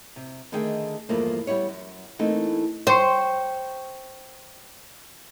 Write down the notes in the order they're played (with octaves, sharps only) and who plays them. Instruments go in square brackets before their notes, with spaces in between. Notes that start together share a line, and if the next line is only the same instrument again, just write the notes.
[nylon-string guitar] C3
D3 D#3 A3 D#4 G#4 G5
E2 G2 F3 A3 A#3
G3 B3 E4 C#5
F#2
E3 A3 A#3 C4 D#4
[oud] C5 [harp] G5 C#6